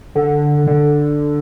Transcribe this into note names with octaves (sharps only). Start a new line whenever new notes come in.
D3
D3